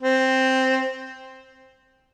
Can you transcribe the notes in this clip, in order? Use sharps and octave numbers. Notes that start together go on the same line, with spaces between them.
C4